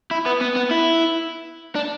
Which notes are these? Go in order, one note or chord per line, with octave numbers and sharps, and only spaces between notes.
E4
B3
B3
B3
E4
D4